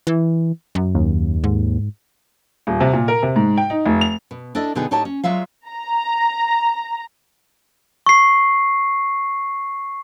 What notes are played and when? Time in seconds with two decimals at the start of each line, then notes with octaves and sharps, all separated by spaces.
0.07 E3
0.75 F#2
0.95 D#2
1.44 G#2
2.67 D#1
2.80 C3
2.93 A#2
3.08 A#4
3.23 C3
3.36 G#2
3.57 G5
3.70 D#4
3.86 F1
4.01 F7
4.31 B2
4.55 D4 E4 A4 D#5
4.75 B2 D3 B3 D#4 G4 G#4
4.91 A2 D#4 G4 C#5 D#5 A5
5.05 C#4
5.24 F#3 G#3 F4 E5 F5
5.68 A#5
8.06 C#6 C7